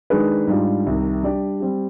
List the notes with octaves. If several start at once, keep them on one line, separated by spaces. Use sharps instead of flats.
D#3 G#3 D4 G#4 B4
G#2 G3 D4 F4
C2 C3 D#3
G3 D4 G4 D5
G3 C4 G4